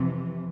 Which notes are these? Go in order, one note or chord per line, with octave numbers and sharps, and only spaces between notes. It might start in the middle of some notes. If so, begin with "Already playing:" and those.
Already playing: F2 C3 E3